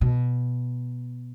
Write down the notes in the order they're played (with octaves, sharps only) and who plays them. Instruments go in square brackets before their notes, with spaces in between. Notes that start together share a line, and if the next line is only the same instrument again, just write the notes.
[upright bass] B2